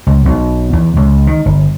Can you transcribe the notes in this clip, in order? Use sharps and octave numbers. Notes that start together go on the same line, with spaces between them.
C#2
B1
E2
C#2
D#3
G1